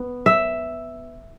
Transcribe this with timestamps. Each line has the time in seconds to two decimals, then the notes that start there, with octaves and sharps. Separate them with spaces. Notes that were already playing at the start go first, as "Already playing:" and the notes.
Already playing: B3
0.26 E5